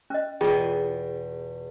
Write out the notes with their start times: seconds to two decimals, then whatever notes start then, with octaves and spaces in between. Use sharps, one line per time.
0.10 C#4 D#5
0.41 E2 B2 F4 G#4 G5